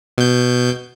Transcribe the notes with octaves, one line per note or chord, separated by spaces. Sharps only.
B2 G6